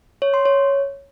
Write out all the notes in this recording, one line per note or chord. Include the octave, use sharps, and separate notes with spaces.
C#5
C6
C#5